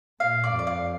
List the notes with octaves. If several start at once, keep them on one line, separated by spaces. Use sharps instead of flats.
A#2 F5
D5
F2
D5
F5